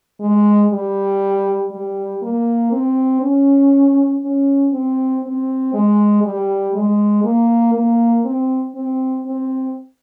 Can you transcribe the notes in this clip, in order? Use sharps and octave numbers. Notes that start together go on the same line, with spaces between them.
G#3
G3
G3
A#3
C4
C#4
C#4
C4
C4
G#3
G3
G#3
A#3
A#3
C4
C4
C4